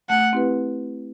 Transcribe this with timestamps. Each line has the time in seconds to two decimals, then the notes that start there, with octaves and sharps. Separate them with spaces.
0.10 A3 F#5
0.33 C4 E4 G4 B4